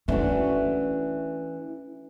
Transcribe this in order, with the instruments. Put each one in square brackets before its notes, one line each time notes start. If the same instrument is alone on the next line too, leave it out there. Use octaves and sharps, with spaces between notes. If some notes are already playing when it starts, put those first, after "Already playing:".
[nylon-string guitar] E3 A3 D4 F#4 [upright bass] C#4